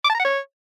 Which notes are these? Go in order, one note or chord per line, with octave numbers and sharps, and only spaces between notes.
D6
A5
A#5
F#5
C#5